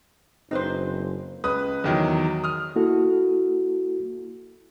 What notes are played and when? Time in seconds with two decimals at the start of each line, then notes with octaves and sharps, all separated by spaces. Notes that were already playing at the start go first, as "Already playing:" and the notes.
0.51 F#1 C4 D#4 B4 C5
1.44 C#2 B4 D#6
1.84 E2 D#3 F#3
2.44 D#6 F6
2.76 A#3 E4 F#4 A4